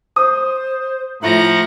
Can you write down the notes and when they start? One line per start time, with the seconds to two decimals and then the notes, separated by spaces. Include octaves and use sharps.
0.16 C5 D#6
1.23 A2 F3 E4 F4 F#5 A#5 A#6